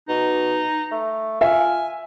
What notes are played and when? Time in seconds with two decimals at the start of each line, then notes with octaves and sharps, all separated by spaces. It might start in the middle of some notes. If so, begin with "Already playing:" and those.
0.09 B2 D#4
0.92 A3
1.41 F4 E5 G#5